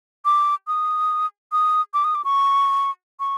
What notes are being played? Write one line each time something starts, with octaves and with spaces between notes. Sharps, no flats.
D6
D#6
D#6
D6
D#6
D6
C#6
C#6